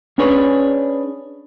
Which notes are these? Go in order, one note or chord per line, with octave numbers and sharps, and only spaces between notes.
C#4 D4 G#4 B4 C#5